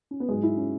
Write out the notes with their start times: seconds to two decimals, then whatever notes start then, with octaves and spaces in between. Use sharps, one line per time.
0.11 C#4
0.20 B3
0.29 G#2 F#3 G#3
0.43 E4
0.57 C#4